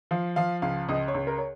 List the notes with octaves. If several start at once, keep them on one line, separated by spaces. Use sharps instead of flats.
F3 F5
F3 F5
C#2 F5
C#2 D#5
C#5
C#2
A#4
C#5